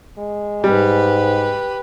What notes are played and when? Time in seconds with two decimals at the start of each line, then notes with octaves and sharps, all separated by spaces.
0.19 G#3
0.64 G#2 G3 G4 B4